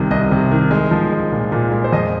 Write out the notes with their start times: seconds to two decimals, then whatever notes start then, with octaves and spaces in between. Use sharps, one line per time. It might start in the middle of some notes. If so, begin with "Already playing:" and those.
Already playing: C2 C3 D#3
0.11 C2 D#5
0.31 C3
0.51 D#3
0.71 G#3
0.91 F3
1.12 G#3
1.32 A#2
1.52 A#2
1.72 G#3
1.84 C5
1.92 F2 D#5